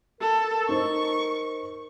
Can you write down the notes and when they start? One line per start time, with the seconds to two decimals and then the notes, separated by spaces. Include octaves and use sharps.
0.21 A4 A#4
0.69 D#4 C5 C#6